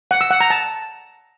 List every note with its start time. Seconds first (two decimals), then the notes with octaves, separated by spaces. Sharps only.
0.11 F#5
0.21 E6
0.31 F#5
0.40 A#5
0.50 A5